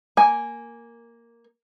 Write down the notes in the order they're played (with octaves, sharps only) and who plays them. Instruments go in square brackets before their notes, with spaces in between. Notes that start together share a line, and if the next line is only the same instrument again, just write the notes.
[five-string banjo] A#3 G#5